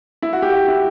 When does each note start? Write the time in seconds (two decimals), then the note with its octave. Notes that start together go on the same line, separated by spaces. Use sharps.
0.22 E4
0.33 F#4
0.42 G4
0.52 F#4
0.68 E4